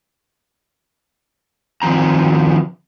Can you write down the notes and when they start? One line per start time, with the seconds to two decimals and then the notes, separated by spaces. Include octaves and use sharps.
1.82 D#3 F3 C4 A#5